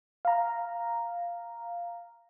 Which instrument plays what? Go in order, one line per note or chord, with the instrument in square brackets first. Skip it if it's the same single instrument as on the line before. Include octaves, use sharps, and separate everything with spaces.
[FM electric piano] F5 A#5